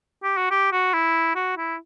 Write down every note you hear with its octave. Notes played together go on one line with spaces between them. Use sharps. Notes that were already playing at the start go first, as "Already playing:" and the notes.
G4
F#4
G4
F#4
E4
F#4
E4